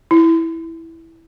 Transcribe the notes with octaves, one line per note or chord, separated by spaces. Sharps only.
E4